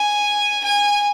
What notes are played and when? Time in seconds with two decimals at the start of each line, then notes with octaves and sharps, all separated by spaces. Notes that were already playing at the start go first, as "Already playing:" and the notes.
Already playing: G#5
0.63 G#5